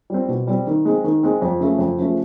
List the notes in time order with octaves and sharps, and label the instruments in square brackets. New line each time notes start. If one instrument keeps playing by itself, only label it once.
[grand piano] G3 C4
B2
G3 C4
D#3
G#3 C4
D#3
G#3 C4
F2
C#3 F3 A3
F2
C#3 F3 A3